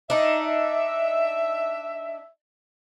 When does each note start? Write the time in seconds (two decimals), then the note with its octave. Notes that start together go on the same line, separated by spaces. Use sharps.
0.10 D4 D#4 E5